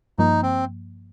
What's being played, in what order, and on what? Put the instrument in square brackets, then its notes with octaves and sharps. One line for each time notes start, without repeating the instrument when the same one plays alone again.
[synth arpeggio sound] G2 F3 A#3 [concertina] D#4
[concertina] C4